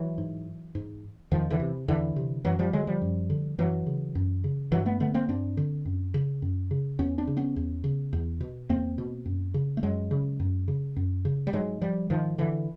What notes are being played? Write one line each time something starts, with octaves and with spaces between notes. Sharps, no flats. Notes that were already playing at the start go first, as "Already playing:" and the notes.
Already playing: E3 F#3
G#2
G#2
E2 D#3 F3
D3 E3
C3
E2 D3 E3
C3
F#2 E3 F#3
F3 G3
D3 F#3 G#3
F3 G3
F#2
D3
F#2 E3 F#3
C#3
F#2
C#3
G2 E3 F#3
A3 B3
D3 A3 B3
A#3 C4
G2 C4 D4
D3
F#2
C#3
F#2
C#3
E2 B3 C#4
C4 D4
C#3
B3 C#4
E2
C#3
E2
B2
E2 A#3 C4
B2
F#2
C#3
A3
F#2 F#3 G#3
C#3
F#2
C#3
F#2
C#3
G3
G#2 F#3 G#3
F3 G3
G#2 D#3 F3
D3 E3